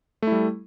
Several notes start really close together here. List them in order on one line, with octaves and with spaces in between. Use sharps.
A3 E4 G3